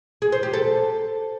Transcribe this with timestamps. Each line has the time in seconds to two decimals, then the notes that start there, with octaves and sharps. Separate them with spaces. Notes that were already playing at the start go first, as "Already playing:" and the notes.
0.22 G#4
0.32 C5
0.43 G4
0.53 A4